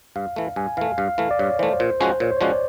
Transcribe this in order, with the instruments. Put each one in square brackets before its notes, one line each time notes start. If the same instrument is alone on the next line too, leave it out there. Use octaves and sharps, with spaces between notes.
[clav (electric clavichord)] G2 [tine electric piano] F5
[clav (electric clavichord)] E3 A3
[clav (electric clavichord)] G2 [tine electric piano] G#5
[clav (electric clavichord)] E3 A3 [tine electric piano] F5
[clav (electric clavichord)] G2 [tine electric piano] F5
[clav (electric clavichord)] E3 A3 [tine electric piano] F5
[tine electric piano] D5
[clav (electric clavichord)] G2 [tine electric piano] C#5
[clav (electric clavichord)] E3 A3 [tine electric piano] C5
[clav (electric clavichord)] A#2 [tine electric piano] C5
[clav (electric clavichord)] F3 G#3 C#4 F#4 [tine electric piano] C5
[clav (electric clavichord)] A#2 [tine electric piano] C#5
[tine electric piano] C5
C#5
[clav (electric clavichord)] F3 G#3 C#4 F#4 [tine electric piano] D5